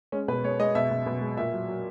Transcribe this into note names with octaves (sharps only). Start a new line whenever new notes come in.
G#3 C#4
B2 B4
G#3 C#5
G#3 D#5
B2 E5
B2
B2
G#3
A#2 E5
F#3
F#3